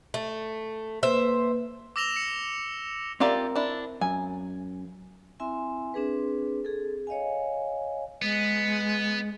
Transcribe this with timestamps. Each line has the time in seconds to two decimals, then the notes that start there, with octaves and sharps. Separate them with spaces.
0.14 A3
1.03 A#3 B4 C5 E5
1.96 D6 E6 A#6 E7 F7 G7
2.16 C#7
3.20 C4 F4 G4 A#4 D5 E5
3.56 D4 E4
4.01 F#2 G#5
5.40 C4 E4 E5 G#5 C6
5.94 C4 D4 G#4 B4
6.65 G#4 A4
7.07 C#5 D#5 F5 G#5
8.22 G#3 B3